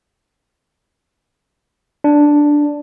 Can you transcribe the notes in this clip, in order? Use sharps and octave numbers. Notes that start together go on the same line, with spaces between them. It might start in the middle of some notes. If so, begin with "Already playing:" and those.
D4